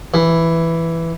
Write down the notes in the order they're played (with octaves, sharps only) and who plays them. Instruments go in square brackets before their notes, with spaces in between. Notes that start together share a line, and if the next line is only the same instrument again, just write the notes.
[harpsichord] E3